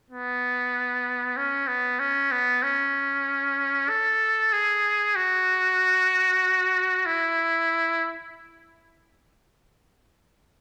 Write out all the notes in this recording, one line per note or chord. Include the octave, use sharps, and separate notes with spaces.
B3
C#4
B3
C#4
B3
C#4
A4
G#4
F#4
E4